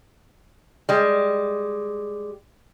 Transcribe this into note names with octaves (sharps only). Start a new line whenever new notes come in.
G3 G#3